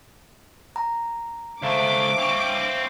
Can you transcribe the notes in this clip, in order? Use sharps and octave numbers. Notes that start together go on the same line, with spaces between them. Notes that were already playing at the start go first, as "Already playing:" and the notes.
A#5
C#2 A3 C5 E5 F5 D6
C4 C#5